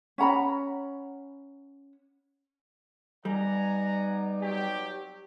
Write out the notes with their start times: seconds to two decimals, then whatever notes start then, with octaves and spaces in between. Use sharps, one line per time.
0.18 C#4 F#5 A#5 B5
3.25 G3 B3 D#4 D5 F#5 G#5 A#5
4.40 F#3 C4 G4